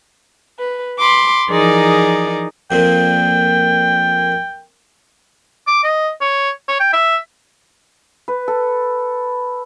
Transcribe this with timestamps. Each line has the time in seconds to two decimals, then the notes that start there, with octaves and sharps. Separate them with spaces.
0.59 B4
0.99 B5 C6 D6
1.49 E3 F3 D#4 G#4 A#4 D5
2.71 F2 A#2 G5
5.67 D6
5.83 D#5
6.21 C#5
6.68 C#5
6.80 G5
6.93 E5
8.28 B4
8.48 A4